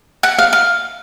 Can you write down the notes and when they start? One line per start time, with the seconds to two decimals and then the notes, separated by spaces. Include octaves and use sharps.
0.23 F#5
0.38 F5
0.53 F5